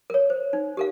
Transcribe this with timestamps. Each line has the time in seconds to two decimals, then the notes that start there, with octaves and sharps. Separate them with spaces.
0.10 A#4 C#5
0.30 C5
0.53 D#4
0.77 G4 A#4 F5